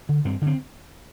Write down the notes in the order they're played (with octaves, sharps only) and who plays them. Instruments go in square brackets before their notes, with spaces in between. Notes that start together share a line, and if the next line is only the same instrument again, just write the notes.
[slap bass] D3
G2 C4
D3
C4